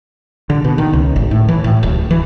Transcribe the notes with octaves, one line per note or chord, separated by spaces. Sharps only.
D3
B2
D#3
C#2
G#1
A2
E3
A2
D1
E3